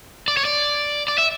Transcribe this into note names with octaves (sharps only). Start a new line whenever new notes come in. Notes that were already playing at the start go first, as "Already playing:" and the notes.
D5
C#5
D5
D5
E5